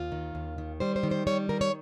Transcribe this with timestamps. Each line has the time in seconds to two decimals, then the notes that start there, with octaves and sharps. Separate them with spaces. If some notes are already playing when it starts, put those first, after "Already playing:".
Already playing: D#2 F4
0.12 D#3
0.35 D#2
0.58 D#3
0.80 G3 C5
0.96 C5
1.03 D#3
1.11 C5
1.27 G3 C#5
1.49 D#3 A#4
1.61 C#5